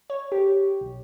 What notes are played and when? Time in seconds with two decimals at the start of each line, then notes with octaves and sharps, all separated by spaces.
0.10 C#5
0.32 G4
0.81 B1